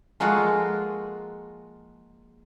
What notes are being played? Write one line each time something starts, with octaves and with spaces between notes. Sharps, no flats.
F3 G#3 A#3 F4 F#4 A4